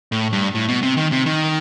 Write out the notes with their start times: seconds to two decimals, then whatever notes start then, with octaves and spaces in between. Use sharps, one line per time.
0.12 A2
0.33 G2
0.55 A2
0.69 B2
0.83 C3
0.97 D#3
1.12 C3
1.26 D#3